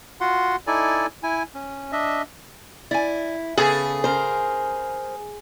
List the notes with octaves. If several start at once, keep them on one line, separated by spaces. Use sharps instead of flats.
F4 F#4 F#5 C6
D#4 E4 A4 D5 G#5
E4 G#5
C#4
D4 D#5 E5
E4 D5 G#5
C#3 B3 G#4 A4 B4
C#3 A#4 C5